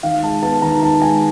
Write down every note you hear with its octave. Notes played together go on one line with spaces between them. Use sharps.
D#3 F5
G#3 A5
B3 A5
D#3 A#5
D#3 A5
G#3 G#5